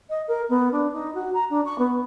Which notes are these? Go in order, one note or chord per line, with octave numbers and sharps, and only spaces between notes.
D#5
A#4
B3
D4
D#4
F#4
A#5
D4
C#6
B3